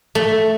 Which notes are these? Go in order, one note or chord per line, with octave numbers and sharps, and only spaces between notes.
A3